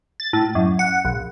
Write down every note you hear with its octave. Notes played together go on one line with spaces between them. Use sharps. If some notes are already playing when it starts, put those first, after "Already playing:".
A6
A2
F#2
F#5
A#1